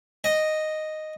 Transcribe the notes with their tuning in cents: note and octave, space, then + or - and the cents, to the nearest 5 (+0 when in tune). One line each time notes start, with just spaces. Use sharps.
D#5 -5 G5 +0